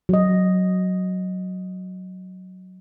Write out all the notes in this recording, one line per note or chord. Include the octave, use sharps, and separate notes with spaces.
F#3 D#5